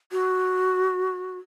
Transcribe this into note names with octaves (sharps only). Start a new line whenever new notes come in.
F#4